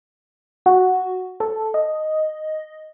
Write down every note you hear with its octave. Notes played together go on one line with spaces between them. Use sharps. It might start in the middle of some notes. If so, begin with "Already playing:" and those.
F#4
A4
D#5